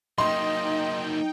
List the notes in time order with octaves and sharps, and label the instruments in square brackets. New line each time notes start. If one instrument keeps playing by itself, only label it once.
[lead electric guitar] F#3 A#3 [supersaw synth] D#4 G5 [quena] D#5 [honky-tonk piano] C6